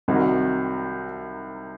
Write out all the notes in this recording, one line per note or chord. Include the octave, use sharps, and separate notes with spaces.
C2 C3 D#3 F#3